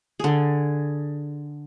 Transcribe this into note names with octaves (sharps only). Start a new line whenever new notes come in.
D3 G#4